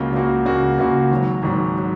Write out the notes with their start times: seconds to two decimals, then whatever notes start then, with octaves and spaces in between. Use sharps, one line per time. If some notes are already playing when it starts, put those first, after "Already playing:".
Already playing: C#2 C#3 A#3 F#4
0.12 C#2 C#3 A#3 F#4
0.45 C#2 C#3 A#3 F#4
0.78 C#2 C#3 A#3 F#4
1.11 G#1 G#2 F#3
1.43 G#1 G#2 F#3
1.79 F#3